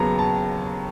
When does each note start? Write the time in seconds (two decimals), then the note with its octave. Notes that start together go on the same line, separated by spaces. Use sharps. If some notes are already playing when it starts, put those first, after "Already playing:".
Already playing: D#2 C#3 F#3 B3 A5 A#5
0.19 A5